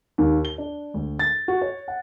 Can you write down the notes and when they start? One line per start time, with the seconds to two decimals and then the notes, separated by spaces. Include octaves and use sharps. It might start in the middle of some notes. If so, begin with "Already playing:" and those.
0.18 D#2
0.45 G7
0.58 D4
0.94 D2
1.19 A6
1.48 F#4
1.62 C#5
1.88 F#5